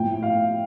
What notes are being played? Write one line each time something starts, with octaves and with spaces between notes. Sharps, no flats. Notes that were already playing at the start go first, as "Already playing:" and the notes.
Already playing: A2 F3 G5
F5